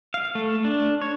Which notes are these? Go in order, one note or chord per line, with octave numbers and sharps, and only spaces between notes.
F5
A3
D4
C#5